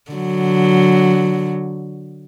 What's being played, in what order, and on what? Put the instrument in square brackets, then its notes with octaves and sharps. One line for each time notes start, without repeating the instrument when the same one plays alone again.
[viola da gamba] D3 F#3